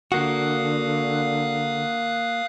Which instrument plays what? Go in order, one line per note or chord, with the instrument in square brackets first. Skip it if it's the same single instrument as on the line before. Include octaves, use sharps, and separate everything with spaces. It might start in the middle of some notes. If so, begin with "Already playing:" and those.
[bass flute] D3 [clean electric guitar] A#3 F#4 [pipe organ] F5 D#6 F#6